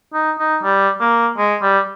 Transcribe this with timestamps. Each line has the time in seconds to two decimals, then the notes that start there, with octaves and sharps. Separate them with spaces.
0.14 D#4
0.39 D#4
0.63 G3
1.00 A#3
1.38 G#3
1.62 G3